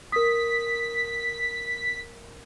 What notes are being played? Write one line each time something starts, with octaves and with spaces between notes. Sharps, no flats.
A#4 D#6 B6